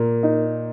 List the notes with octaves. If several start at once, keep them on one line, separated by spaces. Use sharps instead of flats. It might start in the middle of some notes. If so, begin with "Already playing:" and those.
Already playing: A#2 A#3
D#4